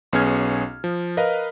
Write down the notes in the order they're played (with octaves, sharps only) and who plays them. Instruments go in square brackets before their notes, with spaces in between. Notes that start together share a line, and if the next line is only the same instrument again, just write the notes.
[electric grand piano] B1 B3 C#4 G#4 F6 G#6
F3
A#4 B4 D#5 F5